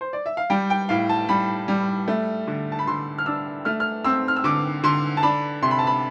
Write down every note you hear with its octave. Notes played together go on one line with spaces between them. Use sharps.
C5
D5
E5
F5
G3 G5
G5
A2 F5
A5
G3 B5
G3
A3
D3
A5
B5
D3 C6
F6
D4 E6
A3 F6
F6
C4 E6
F6
E6
D3 D6
D3 C6
A5
D4 B5
C3 C6
B5
A5
B5